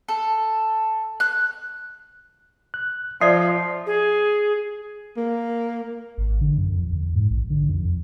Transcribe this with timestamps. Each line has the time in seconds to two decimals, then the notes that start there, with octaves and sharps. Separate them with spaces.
0.08 A4
1.20 F#6
2.74 F#6
3.21 F3 D5 E5 D#6 C7
3.86 G#4
5.17 A#3
6.18 G#1
6.41 D3
6.58 F#2
6.72 F2
6.93 E2
7.15 G#2
7.30 A#1
7.50 D3
7.69 F2
7.85 F2